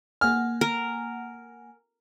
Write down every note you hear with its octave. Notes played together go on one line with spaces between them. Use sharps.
A#3 F#5 G#5 F6
A#4